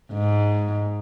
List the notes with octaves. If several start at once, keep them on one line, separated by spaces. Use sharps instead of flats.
G#2